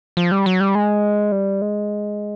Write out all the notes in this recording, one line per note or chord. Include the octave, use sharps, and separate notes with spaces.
F3
G3
F#3
G3
G#3
G3
G#3